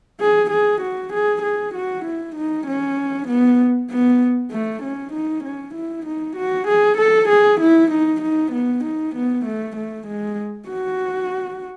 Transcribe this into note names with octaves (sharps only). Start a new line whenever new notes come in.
G#4
G#4
F#4
G#4
G#4
F#4
E4
D#4
C#4
B3
B3
A3
C#4
D#4
C#4
E4
D#4
F#4
G#4
A4
G#4
E4
D#4
D#4
B3
D#4
B3
A3
A3
G#3
F#4